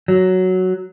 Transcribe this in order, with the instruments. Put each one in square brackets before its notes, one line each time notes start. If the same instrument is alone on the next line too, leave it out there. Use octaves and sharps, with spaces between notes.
[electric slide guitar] F#3